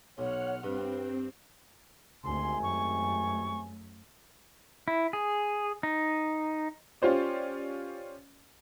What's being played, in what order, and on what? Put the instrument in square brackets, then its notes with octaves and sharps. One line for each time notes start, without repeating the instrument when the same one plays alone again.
[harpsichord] B1 [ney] C#5 [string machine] F#5 F6 F#6
[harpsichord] G2 [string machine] C4 [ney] B4
[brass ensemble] G#1 C3 G#5 [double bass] D2 [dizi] C6
[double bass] F#2 A3 [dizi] C#6
[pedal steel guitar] E4
G#4
D#4
[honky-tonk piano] C#4 F4 G4 C5 D5